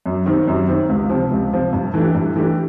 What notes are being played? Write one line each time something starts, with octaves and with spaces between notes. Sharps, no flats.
F#2
D#3 G3 C4
F#2
D#3 G3 C4
C#2
C3 F3
C#2
C3 F3
G2
E3 A3 D4 G4
G2
E3 A3 D4 G4